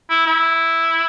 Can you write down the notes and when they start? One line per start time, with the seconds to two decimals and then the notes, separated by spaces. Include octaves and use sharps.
0.10 E4
0.27 E4